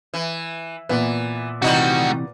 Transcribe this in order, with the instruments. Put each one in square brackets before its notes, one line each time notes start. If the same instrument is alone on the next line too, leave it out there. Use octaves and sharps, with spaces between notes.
[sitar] E3
[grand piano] A#2 B3 B4 [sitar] E3
[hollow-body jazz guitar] C3 E3 [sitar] G3 D#4 F#4 [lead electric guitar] A3 F#5